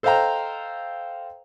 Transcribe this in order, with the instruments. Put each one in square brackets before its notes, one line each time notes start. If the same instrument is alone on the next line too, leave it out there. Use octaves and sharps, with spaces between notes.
[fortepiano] A4 C5 D#5 F5 G5 A#5